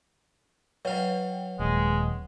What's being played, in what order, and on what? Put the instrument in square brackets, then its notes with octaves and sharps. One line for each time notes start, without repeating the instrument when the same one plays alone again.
[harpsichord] F#3 F5 [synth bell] B4 C#5 G5
[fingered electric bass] D#1 [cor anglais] G#3